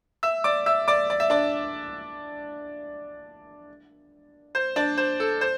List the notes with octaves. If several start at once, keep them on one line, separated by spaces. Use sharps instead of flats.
E5 E6
D5 D6
E5 E6
D5 D6
D5
E5
D4 D5
C5
D4 D5
C5
A4
C5